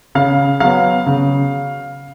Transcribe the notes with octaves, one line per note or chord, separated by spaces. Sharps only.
C#3 F5
F#3 B3 F5
C#3